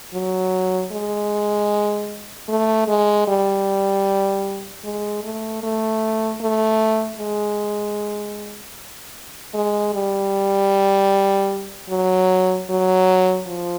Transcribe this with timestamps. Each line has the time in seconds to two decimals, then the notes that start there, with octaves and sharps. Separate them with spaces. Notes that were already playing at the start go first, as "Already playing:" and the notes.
0.14 F#3
0.92 G#3
2.49 A3
2.88 G#3
3.28 G3
4.84 G#3
5.24 A3
5.63 A3
6.41 A3
7.19 G#3
9.54 G#3
9.94 G3
11.90 F#3
12.70 F#3
13.47 F3